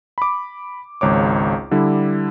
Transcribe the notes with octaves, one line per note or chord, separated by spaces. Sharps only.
B5 D6
G#1 C#2 C#5 D6
D3 G3 E4